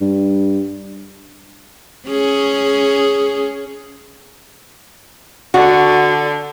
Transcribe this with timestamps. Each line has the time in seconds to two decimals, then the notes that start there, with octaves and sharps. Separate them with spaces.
0.01 G2
2.08 C#4 G#4
5.54 D3 F#4